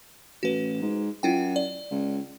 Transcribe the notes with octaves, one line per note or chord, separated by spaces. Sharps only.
A1 F#4 B4
G#2
F#2 E4 F4 G5
D5
C#2